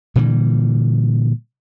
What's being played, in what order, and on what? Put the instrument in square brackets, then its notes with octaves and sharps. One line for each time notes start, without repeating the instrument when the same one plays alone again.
[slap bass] A#2 D3 E3 G3